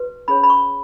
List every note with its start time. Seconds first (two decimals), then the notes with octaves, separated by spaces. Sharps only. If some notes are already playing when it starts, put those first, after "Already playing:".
Already playing: F#4 B4
0.28 C#4 G#4 C#5 B5
0.43 B5
0.50 C#6